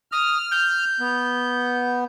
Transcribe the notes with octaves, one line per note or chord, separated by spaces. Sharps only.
D#6 F6
G6
B3